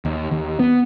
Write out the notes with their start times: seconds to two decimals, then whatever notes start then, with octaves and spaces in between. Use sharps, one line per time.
0.05 D#2
0.31 D#2
0.59 B3